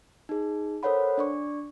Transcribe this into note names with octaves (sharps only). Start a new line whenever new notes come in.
D#4 G#4
A4 A#4 C5 C#5 F#5 B5
D4 D5 C#6